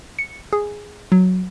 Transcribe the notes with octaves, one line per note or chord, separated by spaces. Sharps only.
C#7
G#4
F#3